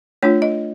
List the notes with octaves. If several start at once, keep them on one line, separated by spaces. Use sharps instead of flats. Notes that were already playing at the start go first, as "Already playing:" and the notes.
A3 D4 F4 C#5
D#5